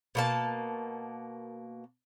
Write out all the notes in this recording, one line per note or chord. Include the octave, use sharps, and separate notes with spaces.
B2 A#3 A5